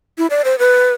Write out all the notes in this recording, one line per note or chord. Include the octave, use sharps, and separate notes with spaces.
E4
D5
C5
B4